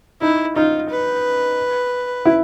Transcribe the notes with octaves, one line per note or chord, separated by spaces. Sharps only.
D#4 E4
D#4 F4
B4
E4